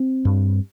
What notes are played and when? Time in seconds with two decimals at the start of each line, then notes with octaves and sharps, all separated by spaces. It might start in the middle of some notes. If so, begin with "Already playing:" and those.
Already playing: C4
0.25 G2